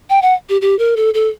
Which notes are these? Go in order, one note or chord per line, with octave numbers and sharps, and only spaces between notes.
G5
F#5
G4
G4
A#4
A4
A4